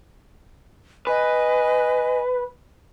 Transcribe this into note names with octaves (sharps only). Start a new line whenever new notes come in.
B4 D#5 G#5